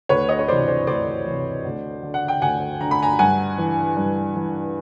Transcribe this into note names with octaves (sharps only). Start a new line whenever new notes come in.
D2 B4 C#5
C#5 D#5
C#5
C3 E3 C5 D5
C5 D5
D2 C5 D5
C3 E3
D2
D3
F#5
G5
D2 F#5 G#5
D3 A#5
B5
G#5 A#5
G2 F#5 G#5
E3
G2
E3